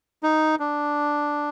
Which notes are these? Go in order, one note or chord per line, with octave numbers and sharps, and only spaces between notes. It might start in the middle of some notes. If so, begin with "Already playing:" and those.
D#4
D4